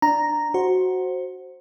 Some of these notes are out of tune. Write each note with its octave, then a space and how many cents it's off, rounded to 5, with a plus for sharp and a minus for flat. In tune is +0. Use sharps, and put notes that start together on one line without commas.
D4 +0 A#5 +0
F#4 +0 C5 +15